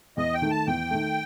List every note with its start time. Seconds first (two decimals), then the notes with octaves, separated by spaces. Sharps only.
0.17 E2 D#5
0.34 G5
0.41 D#3 A3
0.50 A5
0.67 E2 G5
0.91 D#3 A3